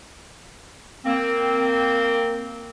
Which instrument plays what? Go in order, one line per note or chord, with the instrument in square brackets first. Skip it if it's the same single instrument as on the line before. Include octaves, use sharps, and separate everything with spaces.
[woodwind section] A#3 C4